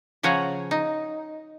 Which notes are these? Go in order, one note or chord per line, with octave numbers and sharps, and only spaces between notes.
C#3 F3 C#5 F#5 G#5 A#5
D#4